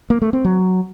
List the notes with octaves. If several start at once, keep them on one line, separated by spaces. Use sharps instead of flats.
A#3
A3
C4
F#3